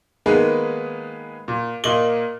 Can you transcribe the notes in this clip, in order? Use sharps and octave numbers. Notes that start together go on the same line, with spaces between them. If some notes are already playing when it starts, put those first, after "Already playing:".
D#3 G#3 A#3 B3 G#4 B4
A#2
A#2 A#3 D#5 F#7 G7